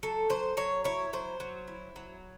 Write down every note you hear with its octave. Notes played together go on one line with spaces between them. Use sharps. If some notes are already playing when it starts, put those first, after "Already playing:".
F#3 A4
F#3 C5
F#3 C#5
E4 C#5
F#3 C5
F#3
E4
F#3